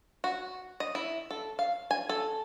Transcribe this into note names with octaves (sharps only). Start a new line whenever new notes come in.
F#4
D#5
E4
A4
F5
G#5
A4